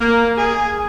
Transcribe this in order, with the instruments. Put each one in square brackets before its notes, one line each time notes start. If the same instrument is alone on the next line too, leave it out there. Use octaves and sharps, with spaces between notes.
[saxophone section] A#3
G#4